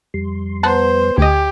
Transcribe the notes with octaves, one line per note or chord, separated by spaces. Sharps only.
F2 G3 C6
B3 B4 C5 F#5 A5 A#5
D2 G4 D#5 G#5